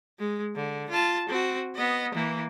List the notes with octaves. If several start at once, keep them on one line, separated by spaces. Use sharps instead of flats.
G#3
D3
F4 A5
C4 F#4
B3 D#5
E3 A#3